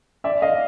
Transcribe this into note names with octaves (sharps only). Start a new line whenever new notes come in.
D5 E5
D#5 F5